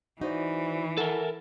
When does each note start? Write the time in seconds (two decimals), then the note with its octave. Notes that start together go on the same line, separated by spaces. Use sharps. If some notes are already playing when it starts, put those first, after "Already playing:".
0.21 E3 D#4 F#4 C5 D5
0.97 A4 A#4 E5 F#5 G#5